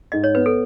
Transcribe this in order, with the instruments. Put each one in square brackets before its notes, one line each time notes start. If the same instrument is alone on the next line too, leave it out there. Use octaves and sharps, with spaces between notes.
[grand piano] G#2 [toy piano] D#5
[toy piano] C#5
[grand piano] B3 [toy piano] B4
[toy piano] A4